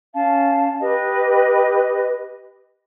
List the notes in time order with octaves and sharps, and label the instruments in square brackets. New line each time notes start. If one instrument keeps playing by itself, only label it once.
[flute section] C#4 F5 A5
G4 B4 D#5